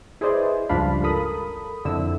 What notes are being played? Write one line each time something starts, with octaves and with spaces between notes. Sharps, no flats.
E4 G#4 B4 C5 D5 D#5
C#2 G2 F3 D4 F5 B5
A4 A#4 B5 D#6
F2 D3 E4 E6